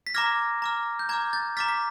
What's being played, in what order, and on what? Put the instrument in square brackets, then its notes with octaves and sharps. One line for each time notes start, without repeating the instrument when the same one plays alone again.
[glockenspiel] B6
A#5 D6 F6 G#6 A#6
A#5 D6 F6
G6
A#5 D6 F6 G#6
G6 A6
A#5 D6 F6 A6 B6
B6